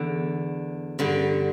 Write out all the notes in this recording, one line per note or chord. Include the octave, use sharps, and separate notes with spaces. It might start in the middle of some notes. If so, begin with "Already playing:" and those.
Already playing: E2 D3
G2 D3